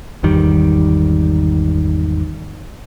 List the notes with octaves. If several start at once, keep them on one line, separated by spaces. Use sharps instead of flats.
G#1 E2 D#3 G3